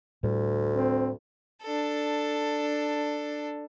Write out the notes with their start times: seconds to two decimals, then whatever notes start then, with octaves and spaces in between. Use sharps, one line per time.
0.23 D2 A2 G3
0.76 C4
1.62 D4 A4